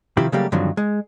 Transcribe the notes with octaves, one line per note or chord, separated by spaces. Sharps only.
C3 D#3 F3 C4 E4 G4
C#3 F#3 G3 A3 A#3 G4
G2 D3 D#3 F3 F#3 C4
G#3